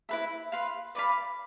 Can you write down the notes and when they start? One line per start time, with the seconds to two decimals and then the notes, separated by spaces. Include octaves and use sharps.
0.09 E4 B4 E5
0.52 B4 F5 C6
0.95 B4 D5 F5 B5